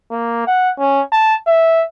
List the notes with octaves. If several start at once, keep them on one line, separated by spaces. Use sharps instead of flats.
A#3
F#5
C#4
A5
E5